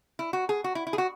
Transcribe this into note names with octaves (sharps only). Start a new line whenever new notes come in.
E4
F#4
G#4
F#4
E4
E4
G#4
F#4